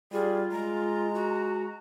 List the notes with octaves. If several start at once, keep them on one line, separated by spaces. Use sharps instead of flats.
G3 F4 G#4
G#3 A#5
F#4